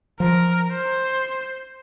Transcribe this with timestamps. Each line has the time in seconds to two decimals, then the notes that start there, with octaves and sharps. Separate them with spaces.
0.20 F3 A#4
0.72 C5